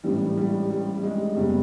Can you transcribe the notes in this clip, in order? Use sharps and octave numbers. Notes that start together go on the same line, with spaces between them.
A1 G#2 E3 G3
G3
G3
G3
G#3
F#1 E2 C#3 G3